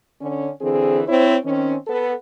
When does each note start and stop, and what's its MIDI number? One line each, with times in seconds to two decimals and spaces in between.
0.20 0.49 50
0.20 0.49 61
0.61 1.02 50
0.61 1.02 52
0.61 1.02 60
0.61 1.02 68
1.07 1.36 60
1.07 1.36 64
1.07 1.36 72
1.07 1.36 73
1.43 1.75 51
1.43 1.75 60
1.43 1.75 61
1.87 2.12 59
1.87 2.12 69